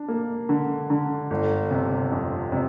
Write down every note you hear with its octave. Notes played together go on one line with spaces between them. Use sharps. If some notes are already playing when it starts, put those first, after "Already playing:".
Already playing: D4
A#3
D3
D3
G1
C3
F2
C3